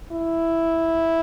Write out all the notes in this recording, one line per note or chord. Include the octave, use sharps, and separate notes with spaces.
E4